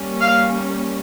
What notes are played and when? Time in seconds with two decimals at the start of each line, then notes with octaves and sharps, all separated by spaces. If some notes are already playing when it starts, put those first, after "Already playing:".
Already playing: G3 A#3 C#4
0.20 F5